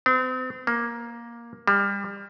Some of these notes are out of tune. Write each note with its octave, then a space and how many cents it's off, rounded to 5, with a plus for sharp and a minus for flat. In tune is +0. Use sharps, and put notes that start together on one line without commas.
C4 -40
A#3 +10
G3 +30